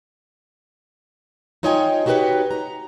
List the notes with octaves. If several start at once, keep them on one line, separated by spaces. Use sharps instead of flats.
D#4 F4 C#5 D#5 G5 G#5
D#4 F#4 G4 A4 B4 C#5
A#5